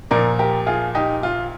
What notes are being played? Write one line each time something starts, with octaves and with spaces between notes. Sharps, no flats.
A#2 F3 A#4 D5
G4 A#4
F4 G#4
D#4 G4
F4